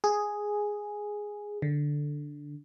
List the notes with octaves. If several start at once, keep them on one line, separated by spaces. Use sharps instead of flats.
G#4
D3